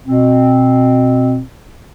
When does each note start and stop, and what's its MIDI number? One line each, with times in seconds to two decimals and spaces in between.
0.06 1.40 47
0.06 1.40 60